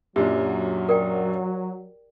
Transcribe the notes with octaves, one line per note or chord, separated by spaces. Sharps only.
F#2 A#2 F#3 D4 G4
A#4 D5 G5